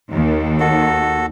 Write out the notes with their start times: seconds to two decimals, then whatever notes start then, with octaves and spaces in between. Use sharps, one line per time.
0.11 D#2
0.60 F#4 A4